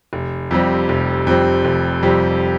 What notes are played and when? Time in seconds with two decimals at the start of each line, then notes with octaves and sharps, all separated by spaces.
0.13 F1
0.51 F2 C3 G3 C4
0.89 F1
1.27 F2 C3 G3 C4
1.65 F1
2.02 F2 C3 G3 C4